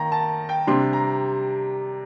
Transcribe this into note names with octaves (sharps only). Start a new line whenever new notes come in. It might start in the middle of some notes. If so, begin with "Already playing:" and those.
Already playing: D#3 A#3 A#5
A5
G5
C3 G3 D4 C6
A#5